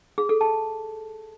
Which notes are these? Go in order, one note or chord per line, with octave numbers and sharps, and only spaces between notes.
G#4
A4
A5